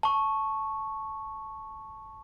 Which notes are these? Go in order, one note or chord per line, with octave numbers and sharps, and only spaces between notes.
A5 C#6